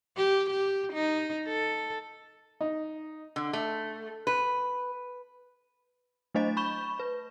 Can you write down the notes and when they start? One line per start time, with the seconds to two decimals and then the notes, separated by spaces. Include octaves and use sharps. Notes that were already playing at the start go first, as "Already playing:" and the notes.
0.17 G4
0.51 G4
0.93 D#4
1.48 A4
2.61 D#4
3.36 D3
3.53 A3
4.27 B4
6.35 F#3 A3 D4 C5 D#5 A6
6.57 B5 C#6 G6 E7 G7
7.00 B4